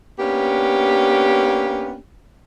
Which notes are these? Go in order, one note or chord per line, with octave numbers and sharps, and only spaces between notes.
A#3 B3 C#4 D4 G4